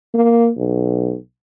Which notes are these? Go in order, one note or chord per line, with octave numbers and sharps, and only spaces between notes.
A#3
B1